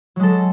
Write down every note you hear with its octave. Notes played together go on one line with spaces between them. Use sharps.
F#3 G#3 A4